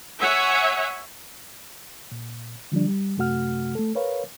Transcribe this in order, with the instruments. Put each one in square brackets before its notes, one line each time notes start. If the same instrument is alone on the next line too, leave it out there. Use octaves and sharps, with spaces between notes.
[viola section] C#5 E5 F#5 G#5
[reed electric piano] A#2
D3 F3 G3 D4
G3
F#2 C3 A3 F#4 F#5 F6
A3 A4
A#4 B4 C#5 F5